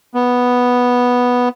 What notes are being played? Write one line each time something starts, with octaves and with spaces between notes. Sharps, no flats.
B3